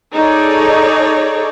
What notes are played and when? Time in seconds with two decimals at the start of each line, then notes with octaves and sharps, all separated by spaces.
0.14 D#4 G#4 A4 C#5 D5